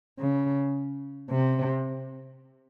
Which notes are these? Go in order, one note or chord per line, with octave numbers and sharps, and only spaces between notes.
C#3
C3